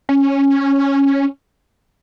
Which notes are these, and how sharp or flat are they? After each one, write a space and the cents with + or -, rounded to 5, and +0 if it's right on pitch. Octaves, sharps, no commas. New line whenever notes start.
C#4 -5